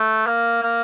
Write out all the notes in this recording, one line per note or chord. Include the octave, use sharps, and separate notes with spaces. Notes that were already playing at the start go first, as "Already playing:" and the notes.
Already playing: A3
A#3
A#3